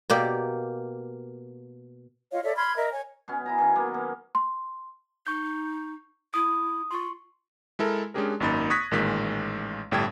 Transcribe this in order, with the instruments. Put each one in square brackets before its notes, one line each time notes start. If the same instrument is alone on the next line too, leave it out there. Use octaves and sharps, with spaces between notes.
[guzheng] B2 A#3 G4 D5
[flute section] F4 C#5 D#5 F5
A4 C#5 D5 E5
B5 C6 F6 G#6
A#4 D#5 E5
C#5 G#5
[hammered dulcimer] B2 B3 C#4
E4 G#5 A#5
B2 D#3 C#4
F#3 A#3 B3
A#3
[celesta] C6
[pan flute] D#4 [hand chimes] C#6 G6
[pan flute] E4 [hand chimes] D#6
[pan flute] F4 [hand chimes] C6 C#6
[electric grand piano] G#3 E4 A4 A#4
G#3 C#4 D4 G4 G#4 A#4
G#1 F#2 A#3 D#4 B5 A6
C#6 D#6 F#6 G#6 A#6 B6
A1 A#2 D#3 G#3 B6
G1 A2 G3 G5 A5 G#6